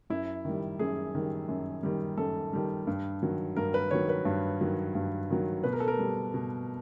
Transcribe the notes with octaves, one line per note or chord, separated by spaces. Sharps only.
F#2 E4
D#3 G3
F#2 G#4
D#3 G3
F#2
D#3 G3
F#2 A4
D#3 G3
G2
D#3 F#3
G2 A#4
B4
D#3 F#3 C#5
B4
G2
D#3 F#3
G2
D#3 F#3
B2 B4
A#4
A4
A#4
G3
B2